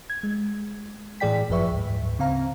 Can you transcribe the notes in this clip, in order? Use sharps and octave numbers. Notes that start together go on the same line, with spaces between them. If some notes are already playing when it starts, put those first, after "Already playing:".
G#6
G#3
A2 E3 G#4 D5 G5 B6
G#1 F#2 F3 B4 E5 C#6
D2 G#2
C#3 C4 F5 A#5